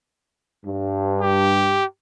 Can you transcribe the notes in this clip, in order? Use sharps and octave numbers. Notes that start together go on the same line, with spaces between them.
G2
G4